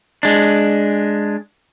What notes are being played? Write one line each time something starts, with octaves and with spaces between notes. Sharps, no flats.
G#3 D4